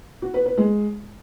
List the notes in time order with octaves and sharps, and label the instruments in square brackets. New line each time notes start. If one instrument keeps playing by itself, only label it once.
[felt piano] F#4
B4
B4
G#3